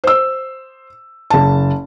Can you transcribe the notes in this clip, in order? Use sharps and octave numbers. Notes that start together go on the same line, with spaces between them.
C5 E6
F#1 A5